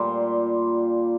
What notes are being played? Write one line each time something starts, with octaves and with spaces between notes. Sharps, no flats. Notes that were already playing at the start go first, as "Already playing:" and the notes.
Already playing: A#2 G3 A#3 C5